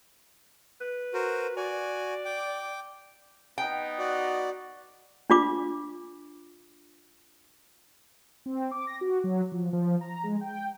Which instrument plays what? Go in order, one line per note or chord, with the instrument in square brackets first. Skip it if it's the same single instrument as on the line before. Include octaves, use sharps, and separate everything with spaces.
[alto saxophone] B4
[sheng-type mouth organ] F#4 A#4 C5
[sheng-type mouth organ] F#4 G#5 [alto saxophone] D5
[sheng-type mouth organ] G5 D6
[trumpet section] B3 D#4 [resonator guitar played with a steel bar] G5
[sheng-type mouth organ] F#4 D5
[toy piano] D4 F4 D6
[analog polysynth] C4
D6
A#6
F#4
F#3
F3
F3
A#5
G#3
G5